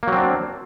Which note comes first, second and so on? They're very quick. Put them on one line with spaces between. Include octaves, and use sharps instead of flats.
A#3 F#3 C4 D4